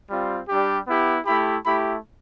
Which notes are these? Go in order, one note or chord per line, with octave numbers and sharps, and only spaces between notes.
G3 C4 F4
G3 D4 G4
B3 E4 G4
A3 E4 G4 B5
A3 E4 G4 B5